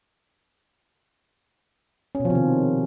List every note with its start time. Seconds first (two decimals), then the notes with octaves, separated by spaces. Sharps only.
2.15 C#4
2.20 B2
2.25 F3
2.30 C3
2.35 D#3